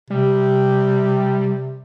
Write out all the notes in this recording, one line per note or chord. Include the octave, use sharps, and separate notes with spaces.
C3 G3